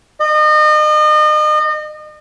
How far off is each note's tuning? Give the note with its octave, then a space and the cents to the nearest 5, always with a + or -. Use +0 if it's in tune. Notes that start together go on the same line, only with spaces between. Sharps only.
D#5 -35